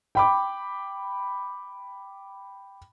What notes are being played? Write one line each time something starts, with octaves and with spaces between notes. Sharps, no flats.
G5 B5 D6